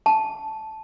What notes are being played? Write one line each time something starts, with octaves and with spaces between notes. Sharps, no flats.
A5